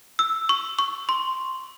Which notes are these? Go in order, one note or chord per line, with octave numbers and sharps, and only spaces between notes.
E6
C#6
C#6
C6